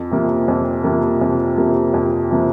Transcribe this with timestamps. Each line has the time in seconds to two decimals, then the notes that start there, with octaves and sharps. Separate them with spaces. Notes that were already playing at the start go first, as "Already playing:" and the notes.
Already playing: F2
0.11 C3 F3 A#3
0.48 F2
0.84 C3 F3 A#3
1.21 F2
1.57 C3 F3 A#3
1.94 F2
2.31 C3 F3 A#3